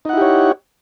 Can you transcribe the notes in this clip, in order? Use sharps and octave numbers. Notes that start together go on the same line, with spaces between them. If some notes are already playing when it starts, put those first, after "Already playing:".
D#4 E4 G4 C#5 F#5